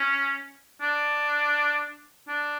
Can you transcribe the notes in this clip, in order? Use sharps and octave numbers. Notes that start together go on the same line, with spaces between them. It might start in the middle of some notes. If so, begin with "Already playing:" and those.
Already playing: C#4
D4
D4